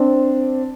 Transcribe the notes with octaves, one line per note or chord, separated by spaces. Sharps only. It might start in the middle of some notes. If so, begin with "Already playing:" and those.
Already playing: C4 D4